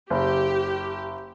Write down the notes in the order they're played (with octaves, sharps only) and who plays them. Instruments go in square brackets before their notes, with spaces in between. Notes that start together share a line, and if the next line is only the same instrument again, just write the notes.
[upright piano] F#1 [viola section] G4